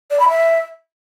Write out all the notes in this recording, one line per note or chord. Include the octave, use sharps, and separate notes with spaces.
D5
B5
E5